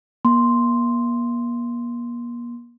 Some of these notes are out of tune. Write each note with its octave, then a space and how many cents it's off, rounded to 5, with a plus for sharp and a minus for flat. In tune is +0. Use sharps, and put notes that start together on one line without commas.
A#3 +40 C6 +0